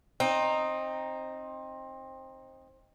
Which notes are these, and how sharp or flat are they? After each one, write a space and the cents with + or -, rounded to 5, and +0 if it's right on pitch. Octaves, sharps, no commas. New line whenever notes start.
C4 +20 D#4 +0